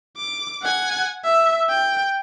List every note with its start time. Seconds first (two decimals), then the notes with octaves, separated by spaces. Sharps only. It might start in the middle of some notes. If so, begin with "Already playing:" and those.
0.17 D6
0.62 F#5 G#5
1.24 E5
1.68 G5